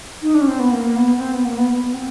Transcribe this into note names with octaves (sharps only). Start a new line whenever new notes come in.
D#4
D4
C#4
C4
B3
A#3
B3
B3
C4
B3
A#3
B3
B3
C4